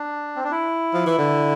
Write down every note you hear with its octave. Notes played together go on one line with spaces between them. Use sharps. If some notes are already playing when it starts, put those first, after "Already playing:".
Already playing: D4
C4
D4
E4
F3
E3
D3